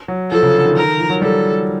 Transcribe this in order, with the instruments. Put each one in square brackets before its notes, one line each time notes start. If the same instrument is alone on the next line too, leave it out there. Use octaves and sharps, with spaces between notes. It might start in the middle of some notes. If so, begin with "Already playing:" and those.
[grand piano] F#3
[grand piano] F3 [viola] A4
[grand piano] C#3
D3
D#3
[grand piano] D#3 [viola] A#4
[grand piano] F3
F#3
[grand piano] G3 [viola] A4